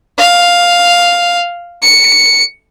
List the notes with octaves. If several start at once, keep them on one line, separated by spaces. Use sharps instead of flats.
F5
C#7